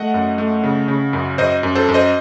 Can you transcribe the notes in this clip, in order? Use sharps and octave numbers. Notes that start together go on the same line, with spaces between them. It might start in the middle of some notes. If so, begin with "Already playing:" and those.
Already playing: A3 D#5 F#5
F#2
A3
C#3
C#3
F#2
F#2 C5 D#5
F#2
A4 C5
F#2
C5 D#5